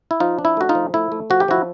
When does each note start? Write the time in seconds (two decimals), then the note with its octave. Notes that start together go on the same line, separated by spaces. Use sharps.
0.11 E4
0.20 F3 D#4 F4
0.39 D4
0.45 E4
0.57 A3 F#4
0.69 D#4 F4
0.75 F3
0.94 A3 E4
1.12 A3
1.30 F3 F#4
1.40 G4
1.48 F3 E4 F#4